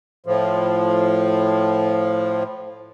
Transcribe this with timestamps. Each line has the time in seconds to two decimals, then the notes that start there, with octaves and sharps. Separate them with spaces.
0.26 A2 F3